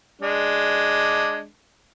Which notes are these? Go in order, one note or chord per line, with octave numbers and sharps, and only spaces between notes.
G#3 D4